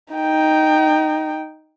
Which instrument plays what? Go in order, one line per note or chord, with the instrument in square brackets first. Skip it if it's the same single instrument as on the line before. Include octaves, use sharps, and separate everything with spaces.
[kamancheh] D#4 G5